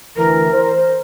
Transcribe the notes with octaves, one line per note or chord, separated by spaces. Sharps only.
D2 E3 A#4
C5